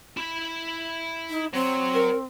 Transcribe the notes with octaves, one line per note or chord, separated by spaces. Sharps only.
E4 B5
D#4
F#3 C4
A#4